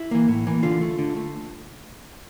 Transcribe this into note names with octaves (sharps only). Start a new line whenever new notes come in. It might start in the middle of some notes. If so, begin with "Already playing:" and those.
Already playing: E4
E3 A#3
A2
E3 A#3
D3 F4
A3
D3
A3